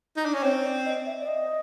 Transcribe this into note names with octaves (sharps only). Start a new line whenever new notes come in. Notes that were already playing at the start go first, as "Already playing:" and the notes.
D#4
D4
C#4
C4 C#5
D5
D#5
E5
D5
D#5